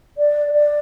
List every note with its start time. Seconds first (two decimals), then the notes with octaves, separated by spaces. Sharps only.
0.17 D5
0.52 D5